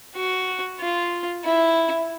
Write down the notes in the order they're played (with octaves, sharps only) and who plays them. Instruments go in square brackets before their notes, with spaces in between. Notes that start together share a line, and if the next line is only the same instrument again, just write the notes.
[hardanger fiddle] F#4
F4
E4